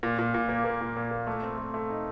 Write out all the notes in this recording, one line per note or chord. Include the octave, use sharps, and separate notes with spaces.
A#2
A#2
A#2
A#3
A#3
A#2
A#2
A#3
A3
C4
A3
A3
D#4